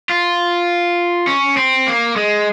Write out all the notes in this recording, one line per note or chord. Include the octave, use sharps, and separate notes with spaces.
F4
C#4
C4
A#3
G#3